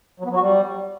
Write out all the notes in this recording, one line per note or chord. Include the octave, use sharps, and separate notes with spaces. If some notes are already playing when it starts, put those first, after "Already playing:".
F#3
B3
F#3
F#4
G3